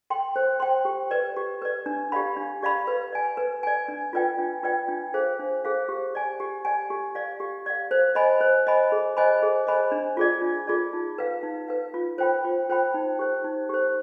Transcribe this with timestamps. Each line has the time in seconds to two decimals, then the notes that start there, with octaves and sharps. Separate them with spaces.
0.10 G5 C6
0.36 C5
0.60 G5 C6
0.85 G4
1.11 B4 D5
1.36 G4
1.62 B4 D5
1.86 D4
2.12 G4 D5 F5 B5
2.37 D4
2.62 G4 D5 F5 B5
2.87 B4
3.12 D5 G#5
3.37 B4
3.63 D5 G#5
3.88 D4
4.13 F4 B4 D5 G5
4.38 D4
4.63 F4 B4 D5 G5
4.89 D4
5.14 G#4 C5 F5
5.39 D4
5.65 G#4 C5 F5
5.89 G4
6.15 D5 G#5
6.40 G4
6.65 D5 G#5
6.90 G4
7.15 D5 F5
7.40 G4
7.66 D5 F5
7.91 C5
8.15 D#5 G#5 B5
8.41 C5
8.67 D#5 G#5 B5
8.92 G#4
9.17 C5 D#5 G#5 B5
9.42 G#4
9.67 C5 D#5 G#5 B5
9.92 D4
10.17 F4 G#4 D5
10.42 D4
10.67 F4 G#4 D5
10.93 D#4
11.18 B4 F5
11.43 D#4
11.68 B4 F5
11.94 F4
12.18 C5 G5 B5
12.45 F4
12.70 C5 G5 B5
12.94 D#4
13.19 G4 C5
13.44 D#4
13.69 G4 C5